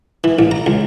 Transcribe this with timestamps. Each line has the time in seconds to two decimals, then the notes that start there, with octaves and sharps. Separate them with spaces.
0.24 E3
0.39 A1
0.51 A#5
0.66 C#2